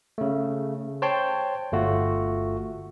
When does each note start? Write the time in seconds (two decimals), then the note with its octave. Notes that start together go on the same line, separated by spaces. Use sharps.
0.18 C#3 A3
1.02 C5 C#5 G5 A5 C6
1.72 G1 A3 F4 F#4